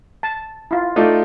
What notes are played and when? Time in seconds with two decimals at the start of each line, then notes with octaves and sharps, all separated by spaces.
0.23 A5
0.71 E4 F4
0.96 A3 D#4 F4 D5